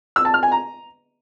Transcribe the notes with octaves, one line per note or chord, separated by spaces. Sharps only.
E6
A5
F6
G#5
A#5